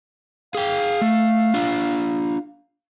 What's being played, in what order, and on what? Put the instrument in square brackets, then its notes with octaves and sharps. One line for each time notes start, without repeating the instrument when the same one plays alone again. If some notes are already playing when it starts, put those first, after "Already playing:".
[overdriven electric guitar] G#4 G5 [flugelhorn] F5
[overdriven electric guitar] A3
D4 F4